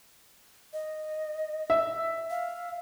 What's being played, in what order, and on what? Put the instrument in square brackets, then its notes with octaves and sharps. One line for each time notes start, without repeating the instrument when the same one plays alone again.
[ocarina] D#5
[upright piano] E5
[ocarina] F5